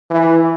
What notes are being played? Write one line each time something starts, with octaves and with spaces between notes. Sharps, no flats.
E3